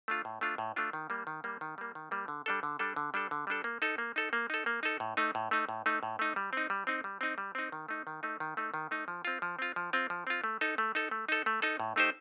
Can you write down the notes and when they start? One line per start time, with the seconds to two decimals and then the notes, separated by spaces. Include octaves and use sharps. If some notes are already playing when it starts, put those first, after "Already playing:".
0.08 A3 D4 F4
0.25 A2
0.41 A3 D4 F4
0.58 A2
0.76 A3 D4 F4
0.93 D#3
1.10 G3 A#3
1.27 D#3
1.44 G3 A#3
1.61 D#3
1.78 G3 A#3
1.95 D#3
2.11 G3 A#3
2.28 D3
2.46 G3 D4 A4
2.63 D3
2.79 G3 D4 A4
2.96 D3
3.14 G3 D4 A4
3.31 D3
3.47 G3 D4 A4
3.64 A#3
3.82 D#4 A4
3.98 A#3
4.16 D#4 A4
4.33 A#3
4.50 D#4 A4
4.66 A#3
4.83 D#4 A4
5.00 A2
5.17 A3 D#4
5.35 A2
5.51 A3 D#4
5.69 A2
5.86 A3 D#4
6.03 A2
6.19 A3 D#4
6.36 G3
6.53 C4 D#4
6.70 G3
6.87 C4 D#4
7.04 G3
7.21 C4 D#4
7.38 G3
7.55 C4 D#4
7.72 D#3
7.89 A3 D#4
8.07 D#3
8.23 A3 D#4
8.40 D#3
8.57 A3 D#4
8.74 D#3
8.91 A3 D#4
9.08 F3
9.25 C4 F4
9.42 F3
9.59 C4 F4
9.76 F3
9.93 C4 F4
10.10 F3
10.27 C4 F4
10.44 A3
10.61 D#4 A4
10.78 A3
10.95 D#4 A4
11.11 A3
11.29 D#4 A4
11.46 A3
11.62 D#4 A4
11.80 A2
11.96 A3 D#4 G4 C5